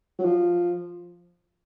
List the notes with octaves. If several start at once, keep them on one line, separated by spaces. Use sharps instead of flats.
F#3
F3